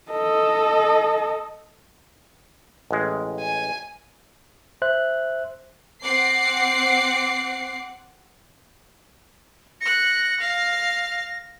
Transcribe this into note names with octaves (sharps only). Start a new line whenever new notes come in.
A4 D#5
A1 G#3
G#5
C5 E5 F#6
C4 F#5 D6 C7
F#6 A#6 C#7
F5